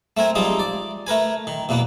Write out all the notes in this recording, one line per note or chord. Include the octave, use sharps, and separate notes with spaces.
A3 C4 A#4 G#5
F3 G3 G#3 C4 D#4
D5
A3 A#4 B4 G#5
D#3
E2 B2 A#3 B3